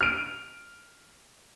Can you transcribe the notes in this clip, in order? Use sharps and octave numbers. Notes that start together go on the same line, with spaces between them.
F6 D7